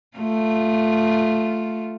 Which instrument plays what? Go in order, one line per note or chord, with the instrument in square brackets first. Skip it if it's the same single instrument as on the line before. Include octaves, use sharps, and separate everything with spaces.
[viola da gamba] A3 F4